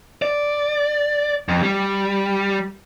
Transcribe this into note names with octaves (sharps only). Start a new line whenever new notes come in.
D5
F2
G3